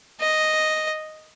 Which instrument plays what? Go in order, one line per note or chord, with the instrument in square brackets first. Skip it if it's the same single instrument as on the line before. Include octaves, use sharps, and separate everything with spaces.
[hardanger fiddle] D#5